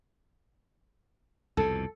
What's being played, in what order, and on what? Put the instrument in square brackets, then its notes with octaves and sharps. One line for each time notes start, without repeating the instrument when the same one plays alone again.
[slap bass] C2 F2 B2 [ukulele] A4